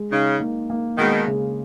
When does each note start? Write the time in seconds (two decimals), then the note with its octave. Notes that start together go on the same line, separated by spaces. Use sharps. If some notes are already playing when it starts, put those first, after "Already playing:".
Already playing: G#3
0.11 C#3 D#4
0.40 A#3
0.70 A#3
0.98 B2 D#3 G#3
1.27 C#3